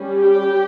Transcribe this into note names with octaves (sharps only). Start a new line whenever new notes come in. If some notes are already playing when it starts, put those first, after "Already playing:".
Already playing: G3 C#4
G4